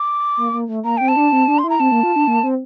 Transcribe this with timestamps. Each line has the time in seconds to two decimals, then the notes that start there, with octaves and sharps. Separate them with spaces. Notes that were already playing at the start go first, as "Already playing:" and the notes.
Already playing: D6
0.37 A#3
0.53 A#3
0.68 A3
0.84 A#3 A#5
0.97 C4 G5
1.08 A5
1.16 D4
1.32 C4
1.48 D4
1.59 C6
1.64 E4
1.70 A#5
1.80 C4 A5
1.92 A#3
2.03 F4
2.16 D4
2.27 A#3
2.43 C4